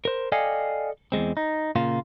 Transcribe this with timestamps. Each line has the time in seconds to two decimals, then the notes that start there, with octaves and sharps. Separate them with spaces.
0.05 A#4 C5
0.32 A4 D5 D#5 F5 G5 G#5
1.12 E2 G#2 G#3 C4
1.37 D#4
1.76 A#2 C#3 A#3 F4